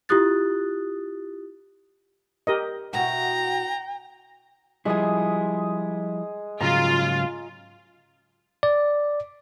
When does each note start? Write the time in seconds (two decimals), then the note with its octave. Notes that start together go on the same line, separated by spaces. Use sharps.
0.09 E4 F4 G4 D#6 F#6 A6
2.47 G4 A#4 D#5
2.93 B2 E4 F#4 G5 A#5
4.85 F3 G3 G#3 E4 D#5 G#5
6.61 G#2 C#3 F#3 F4 A#5
8.63 D5